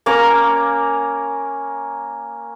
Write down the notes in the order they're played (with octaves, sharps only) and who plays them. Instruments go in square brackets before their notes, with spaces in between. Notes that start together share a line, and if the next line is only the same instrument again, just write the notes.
[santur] A#3 C#4 A#5 D6